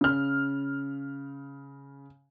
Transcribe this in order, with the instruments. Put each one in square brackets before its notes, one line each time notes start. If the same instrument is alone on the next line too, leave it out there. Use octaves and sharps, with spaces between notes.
[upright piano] C#3 F6